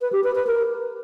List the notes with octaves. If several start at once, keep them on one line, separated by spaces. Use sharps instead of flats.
B4
G4
B4
B4
A#4